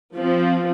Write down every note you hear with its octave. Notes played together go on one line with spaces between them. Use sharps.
F3 C4